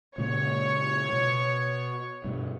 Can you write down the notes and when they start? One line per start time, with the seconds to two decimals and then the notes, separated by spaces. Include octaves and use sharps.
0.18 A#2 C#3 G#3 C#5
1.13 B2
2.24 G2 B2